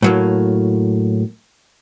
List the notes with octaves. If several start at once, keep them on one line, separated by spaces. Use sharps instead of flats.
A2 F#3 A#3